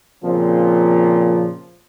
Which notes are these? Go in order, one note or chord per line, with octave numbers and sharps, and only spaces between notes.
A#2 C#3 F3 C4